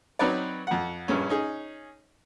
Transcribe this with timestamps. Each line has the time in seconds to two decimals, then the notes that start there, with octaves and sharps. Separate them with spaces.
0.19 F#3 C4 D#4 B4 C#5 D5
0.67 F2 F#5
1.08 A#1 G2 C#4
1.29 C#4 D#4 G#4